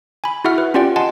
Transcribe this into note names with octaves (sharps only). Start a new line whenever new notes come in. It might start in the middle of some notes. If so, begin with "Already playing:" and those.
G#5 B5
E4 F#4 G#4 E5 F#5 F6
B4
C#4 F4 G4 D5 F#5 G5
D#5 F#5 G#5 A5 C6